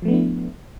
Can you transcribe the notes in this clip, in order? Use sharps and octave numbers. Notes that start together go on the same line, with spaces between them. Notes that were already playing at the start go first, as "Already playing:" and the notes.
F3 A3 B3 D4 E4